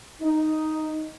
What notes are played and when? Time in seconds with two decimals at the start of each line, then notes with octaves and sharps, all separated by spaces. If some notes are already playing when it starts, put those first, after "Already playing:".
0.21 D#4